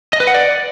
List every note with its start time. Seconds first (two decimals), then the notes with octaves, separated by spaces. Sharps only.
0.13 D#5
0.20 B4
0.27 F#5
0.34 D5